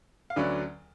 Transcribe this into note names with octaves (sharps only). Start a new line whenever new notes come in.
F5
D2 D3 F#3 C#4 B4 D5